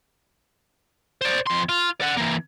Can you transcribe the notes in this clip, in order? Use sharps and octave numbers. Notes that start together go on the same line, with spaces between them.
C5 D5
F2 C6
F4
D5 F#5
E3 A#3